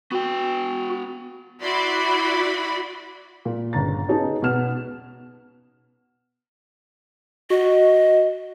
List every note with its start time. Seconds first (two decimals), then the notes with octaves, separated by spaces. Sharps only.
0.11 B3 F#4 G5
1.61 E4 F#4 D5 B5 C6
3.45 A#2
3.73 G1 C#3 A#5 A6
4.08 B3 C#4 D#4 G#4 A5
4.42 B2 B3 F#5 F6 E7
7.50 F#4 D#5